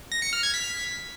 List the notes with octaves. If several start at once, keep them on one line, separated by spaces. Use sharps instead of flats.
A#6
C#7
F6
G#6
B6